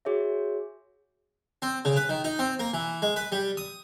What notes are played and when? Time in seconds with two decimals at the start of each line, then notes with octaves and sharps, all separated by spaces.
0.05 F#4 G#4 C#5 E5
1.62 C4
1.85 C#3
1.96 B4
2.09 D#3
2.24 D#4
2.39 C4
2.59 A#3
2.74 E3
3.02 G#3
3.16 B4
3.32 G3
3.57 D#6